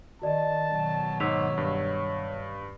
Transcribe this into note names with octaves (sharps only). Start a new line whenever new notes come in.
D#3 F#4 D5 D#5 A5
B2 D#3 F#3
G#2 C#5 E6 B6 F7
G2